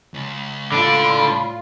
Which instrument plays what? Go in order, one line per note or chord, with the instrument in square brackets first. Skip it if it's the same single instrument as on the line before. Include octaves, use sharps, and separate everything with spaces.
[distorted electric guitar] C#2
[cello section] A2 F4 [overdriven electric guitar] D3 D4 [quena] B5